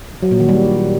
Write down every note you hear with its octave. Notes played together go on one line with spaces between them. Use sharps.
F#3
A#2
D#3
G3